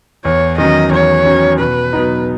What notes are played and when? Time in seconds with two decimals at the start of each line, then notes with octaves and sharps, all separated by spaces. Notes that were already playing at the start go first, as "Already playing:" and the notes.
0.25 E2 C#5
0.58 D#3 F#3 C#4 D#5
0.91 E2 C#5
1.25 D#3 F#3 C#4
1.59 B2 B4
1.93 F#3 B3 D#4